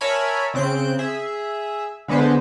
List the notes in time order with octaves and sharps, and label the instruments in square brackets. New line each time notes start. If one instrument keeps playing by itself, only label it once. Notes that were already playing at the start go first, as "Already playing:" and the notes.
[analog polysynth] A#4 C#5 E5 G#5 A5 B5
C#3 C4 F#6 G6 D7
G#4 E5
D3 G#3 B3 B4 C5